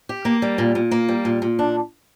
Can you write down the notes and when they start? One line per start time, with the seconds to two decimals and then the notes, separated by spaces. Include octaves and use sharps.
0.09 G4
0.25 A#3
0.42 G3
0.58 A#2
0.75 A#2
0.91 A#3
1.09 G3
1.25 A#2
1.42 A#2
1.59 D4